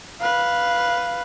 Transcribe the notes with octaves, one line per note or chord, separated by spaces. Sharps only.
B4 F5